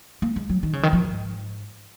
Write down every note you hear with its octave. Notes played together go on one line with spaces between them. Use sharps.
A#3
G#3
F#3
D#3
C#3
D#3
F3
G#2